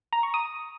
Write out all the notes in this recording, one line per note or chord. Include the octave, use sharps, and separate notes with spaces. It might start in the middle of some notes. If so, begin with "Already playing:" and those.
A#5
C#6
D#6